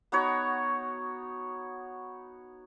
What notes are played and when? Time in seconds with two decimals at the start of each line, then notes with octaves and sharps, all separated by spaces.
0.12 B3 D#4 F#4 C#5